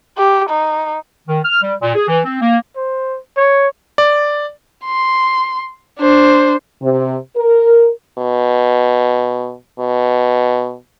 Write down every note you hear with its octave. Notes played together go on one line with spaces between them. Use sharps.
G4
D#4
D#3
F6
G3
A#2
G#4
E3
C4
A#3
C5
C#5
D5
C6
D4 C5
C3
A#4
B2
B2